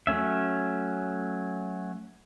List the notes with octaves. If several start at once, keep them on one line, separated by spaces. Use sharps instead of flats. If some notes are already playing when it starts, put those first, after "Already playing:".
F#3 A3 C#4 E5